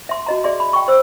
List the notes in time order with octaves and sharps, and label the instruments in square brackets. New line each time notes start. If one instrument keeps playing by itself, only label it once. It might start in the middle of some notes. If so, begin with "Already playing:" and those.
[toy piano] E5 C6
F#4 D#5 A#5
G#4 D5 E5 C6
B5
G5 C#6
C5 E6